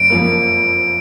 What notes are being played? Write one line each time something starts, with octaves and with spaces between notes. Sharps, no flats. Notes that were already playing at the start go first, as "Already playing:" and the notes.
Already playing: F#1 D7
F2 F3 A#3